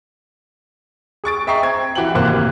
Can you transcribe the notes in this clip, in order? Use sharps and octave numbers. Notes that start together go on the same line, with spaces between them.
G#4 C#6 A6 D7
D#5 E5 G5 A#5 C#6 C7
C4 G#6
E3 F#4 G4 F#5 G5 F#7
G#1 C3 A#3 C5 F5 F#6